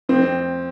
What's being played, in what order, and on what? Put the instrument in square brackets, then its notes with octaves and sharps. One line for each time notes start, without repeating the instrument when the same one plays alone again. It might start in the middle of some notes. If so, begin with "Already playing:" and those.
[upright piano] F2 C4